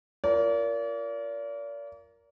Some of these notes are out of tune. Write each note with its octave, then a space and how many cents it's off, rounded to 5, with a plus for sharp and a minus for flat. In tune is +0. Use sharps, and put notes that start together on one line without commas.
F4 -40 A#4 +0 D5 -40